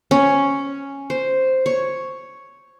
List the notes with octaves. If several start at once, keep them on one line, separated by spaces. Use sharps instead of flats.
C#4
C5
C#5